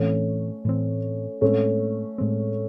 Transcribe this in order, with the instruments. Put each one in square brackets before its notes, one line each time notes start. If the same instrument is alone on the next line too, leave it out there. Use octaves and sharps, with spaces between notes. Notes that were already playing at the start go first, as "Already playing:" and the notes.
Already playing: [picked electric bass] A2 E3 C4 [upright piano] A3 C#4
[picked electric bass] A2 E3 C4
[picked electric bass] A2 G#3 C4 [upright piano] A3 C#4
[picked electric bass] A2 G#3 C4